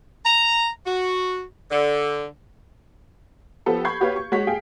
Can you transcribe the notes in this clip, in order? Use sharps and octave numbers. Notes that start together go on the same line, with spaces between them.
A#5
F#4
D3
F3 B3 G4 A4
B5 C#6 G6 G#6 C7
F#4 G4 B4 C#5 F5
C#6
G#3 F#4 C#5 B6
G#4 F5 G5 G#5